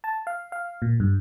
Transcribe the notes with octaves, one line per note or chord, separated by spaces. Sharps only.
A5
F5
F5
A#2
G2